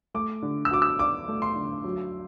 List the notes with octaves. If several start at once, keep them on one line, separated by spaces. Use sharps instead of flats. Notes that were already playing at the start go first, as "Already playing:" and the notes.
A3 D6
D3
E6
F#4 D6
E6
D4 D6
A3
C6
D3
F#3